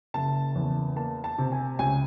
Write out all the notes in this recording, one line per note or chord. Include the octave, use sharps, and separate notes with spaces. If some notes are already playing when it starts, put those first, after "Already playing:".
F#1 A5
E2
A#3 A5
A5
C3
G#5
C#2 G#5